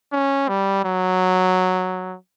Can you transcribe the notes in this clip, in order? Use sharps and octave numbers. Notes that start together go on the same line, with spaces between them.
C#4
G3
F#3